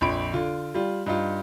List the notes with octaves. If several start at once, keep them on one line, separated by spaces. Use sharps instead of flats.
A#1 F2 B5 D7
D3 F4
G3 F4
G2 D#4 F4